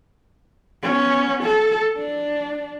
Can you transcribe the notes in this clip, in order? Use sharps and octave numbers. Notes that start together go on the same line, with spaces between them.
B3 C#4
A4
D4